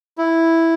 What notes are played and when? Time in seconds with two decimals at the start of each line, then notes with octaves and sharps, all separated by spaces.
0.18 E4